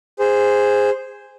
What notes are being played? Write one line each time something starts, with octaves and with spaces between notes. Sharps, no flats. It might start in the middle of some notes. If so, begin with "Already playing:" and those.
G#4 C5